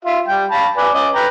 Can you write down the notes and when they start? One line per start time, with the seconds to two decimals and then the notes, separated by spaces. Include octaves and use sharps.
0.05 F4 E5
0.27 G3 G5
0.51 F5 A5 B5
0.77 B4 D5 G#5
0.94 C#4 D#5 D6
1.15 B4 G5 A#5